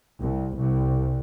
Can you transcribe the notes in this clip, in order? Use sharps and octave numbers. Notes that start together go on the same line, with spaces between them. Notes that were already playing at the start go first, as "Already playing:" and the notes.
C2
C2